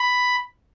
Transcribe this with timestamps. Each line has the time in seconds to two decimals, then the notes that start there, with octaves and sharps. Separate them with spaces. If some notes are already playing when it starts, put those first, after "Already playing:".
Already playing: B5